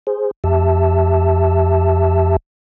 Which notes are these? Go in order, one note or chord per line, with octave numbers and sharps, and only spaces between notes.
G#4 C5
F2 G4 E5 A5